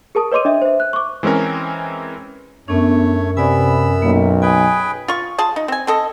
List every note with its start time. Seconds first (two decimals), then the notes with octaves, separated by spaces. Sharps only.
0.15 G#4 A#4 A5 D#6
0.32 B4 C#5 D#5 C6 D6 D#7
0.45 D4 D#5 E5
0.62 C5 E5
0.80 F#6
0.93 C#6 D6
1.23 E3 G#3 C4 C#4 A#4
2.68 F#2 A3 B3 D4 C#5
3.37 C3 B3 D5 G#5 B5 E6
4.02 B1 A#3
4.42 G#4 B4 G5 G#5
5.08 F4 C#6
5.38 F4 G#4 A5
5.56 D#4
5.68 C4 G#5
5.87 C4 A4 D#5